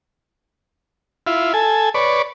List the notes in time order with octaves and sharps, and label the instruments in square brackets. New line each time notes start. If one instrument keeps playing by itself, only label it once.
[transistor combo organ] E4 F4
A4 G#5
B4 C#5 D5